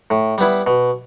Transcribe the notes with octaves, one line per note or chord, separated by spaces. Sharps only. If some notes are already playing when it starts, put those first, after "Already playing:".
A2
G3 B3 E4
B2